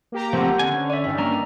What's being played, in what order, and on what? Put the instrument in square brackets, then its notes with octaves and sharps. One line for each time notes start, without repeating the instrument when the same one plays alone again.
[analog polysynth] A#3 G4 A#5
[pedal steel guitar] F3 A3 C4 [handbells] C5 F#5
[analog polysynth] D3 [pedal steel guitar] C#4 G#5
[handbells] D5 E5
[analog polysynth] G2 D#3 [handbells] E5
[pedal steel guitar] A#3 C#4 D4 [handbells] A#5